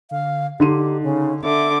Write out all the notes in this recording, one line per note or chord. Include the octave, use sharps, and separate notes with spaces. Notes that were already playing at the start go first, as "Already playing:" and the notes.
D3 F5
D3 D#4 G4 C6 D#7
C#3
D3 E5 D6